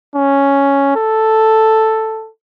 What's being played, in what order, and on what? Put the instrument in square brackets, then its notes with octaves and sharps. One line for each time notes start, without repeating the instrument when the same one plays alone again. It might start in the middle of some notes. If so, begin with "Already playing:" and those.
[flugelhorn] C#4
A4